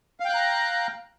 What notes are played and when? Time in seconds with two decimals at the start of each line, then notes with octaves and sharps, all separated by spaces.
0.20 F5
0.25 G5
0.30 F#6
0.34 A#5